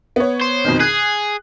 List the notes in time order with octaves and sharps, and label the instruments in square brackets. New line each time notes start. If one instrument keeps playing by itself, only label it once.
[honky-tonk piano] B3 C#5
[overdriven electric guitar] C5
[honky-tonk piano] F2 B2 D#3
[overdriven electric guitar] G#4 [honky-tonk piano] F#6